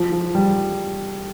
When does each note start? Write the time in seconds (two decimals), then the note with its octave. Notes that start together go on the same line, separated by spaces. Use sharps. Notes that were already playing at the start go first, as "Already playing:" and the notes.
Already playing: F3
0.12 F3
0.35 G3